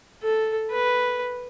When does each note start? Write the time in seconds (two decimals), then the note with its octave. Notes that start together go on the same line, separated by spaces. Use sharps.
0.22 A4
0.71 B4